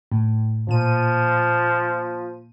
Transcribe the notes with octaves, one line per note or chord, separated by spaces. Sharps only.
A2
A#2 F3 D#7